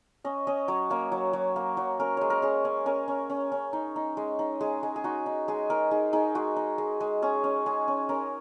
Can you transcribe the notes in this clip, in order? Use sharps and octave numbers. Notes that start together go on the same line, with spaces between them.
C#4 D#5
C#4 D#5
F#3 C#5
A#3 C#5
F#3
F#3
A#3
F#3
C#4 A#4
G#3 C#5
A#4
C#4 G#4
C#4
C#4 A#4
C#4
C#4
C#4
D#4
D#4
G#3
D#4
G#3 G#4
G#3
G#4
D#4 F#4
D#4
G#3 G#4
D#4 A#4
D#4 G#4
D#4 G#4
G#3 F#4
D#4
G#3
G#3
C#4 G#4
C#4
G#3 G#4
C#4
C#4 A#4